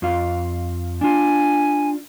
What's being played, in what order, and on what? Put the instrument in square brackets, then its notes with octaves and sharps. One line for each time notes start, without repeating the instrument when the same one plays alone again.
[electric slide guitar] F2 F4 F5
[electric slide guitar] D4 F4 [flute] G#5